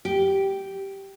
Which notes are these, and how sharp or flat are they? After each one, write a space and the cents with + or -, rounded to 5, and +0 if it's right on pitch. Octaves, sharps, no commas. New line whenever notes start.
G4 -10